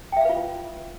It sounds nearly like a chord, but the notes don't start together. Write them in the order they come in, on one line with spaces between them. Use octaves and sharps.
G5 E5 F5 B4 F4